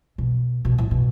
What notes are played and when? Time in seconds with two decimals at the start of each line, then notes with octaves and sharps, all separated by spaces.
0.18 B2
0.65 B2
0.78 A2
0.91 B2